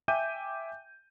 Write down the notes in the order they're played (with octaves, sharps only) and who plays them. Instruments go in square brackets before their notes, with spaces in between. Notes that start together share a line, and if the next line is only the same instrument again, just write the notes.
[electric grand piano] E5 G5 G#5 D6 G6 D#7